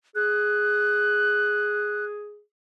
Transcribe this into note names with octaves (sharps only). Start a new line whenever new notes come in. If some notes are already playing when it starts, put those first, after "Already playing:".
G#4 F#6